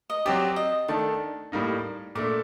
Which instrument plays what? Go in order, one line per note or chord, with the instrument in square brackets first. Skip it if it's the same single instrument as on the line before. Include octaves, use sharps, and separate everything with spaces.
[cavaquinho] D#5
[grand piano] F#3 C4 G4 [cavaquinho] D5
[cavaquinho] D#5
[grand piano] D#3 A3 D4 [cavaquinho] A5
[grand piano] A2 G3 A#3 D#4
[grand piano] A#2 A3 D4 [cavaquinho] D6